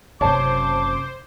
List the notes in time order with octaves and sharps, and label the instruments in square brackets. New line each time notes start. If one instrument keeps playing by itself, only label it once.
[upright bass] F#1 C3 [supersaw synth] C5 [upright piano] C#5 A5 [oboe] D6